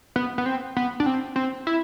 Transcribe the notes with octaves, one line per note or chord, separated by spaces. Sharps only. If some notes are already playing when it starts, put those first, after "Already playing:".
B3
B3
C4
B3
D4
C4
C4
E4